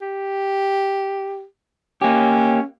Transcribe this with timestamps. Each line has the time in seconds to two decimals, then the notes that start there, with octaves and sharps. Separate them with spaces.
0.01 G4
2.01 A#3 C#4 G4